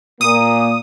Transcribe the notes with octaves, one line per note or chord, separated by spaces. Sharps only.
A#2 A#3 D#6